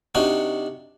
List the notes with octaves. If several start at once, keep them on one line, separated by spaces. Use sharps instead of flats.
C3 D4 D#4 F#4